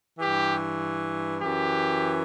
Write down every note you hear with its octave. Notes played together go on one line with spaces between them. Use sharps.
G2 E3 G4
F#2 E3 G4